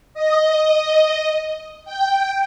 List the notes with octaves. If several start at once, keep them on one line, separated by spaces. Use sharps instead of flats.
D#5
G5